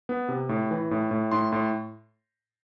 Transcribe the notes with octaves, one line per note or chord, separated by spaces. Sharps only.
B3
C3
A2
E3
A2
A2
A2 C6
A2 C6